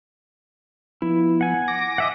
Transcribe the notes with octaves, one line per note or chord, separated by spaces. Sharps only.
F3 B3 E4
F#5 G#5
D6 A#6
D#5 E5 F#5